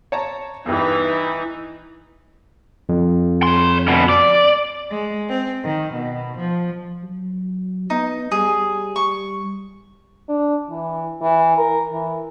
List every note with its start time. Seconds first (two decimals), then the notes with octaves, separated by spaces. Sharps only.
0.12 C#5 A5 A#5
0.66 E2 G2 E3 D#4
2.89 F2
3.43 C#5 C6
3.87 D2 B2
4.09 D5
4.89 G#3
5.28 C4
5.63 D#3
5.93 B2
6.37 F3
7.03 F#3
7.90 B3 D#4
8.32 G3 G#4
8.96 C#6
10.28 D4
10.70 E3
11.21 E3
11.57 A#4
11.92 E3